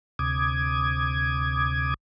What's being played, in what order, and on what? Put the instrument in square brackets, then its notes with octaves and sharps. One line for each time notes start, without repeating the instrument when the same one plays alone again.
[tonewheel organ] D2 C3 D6 D#6 G#6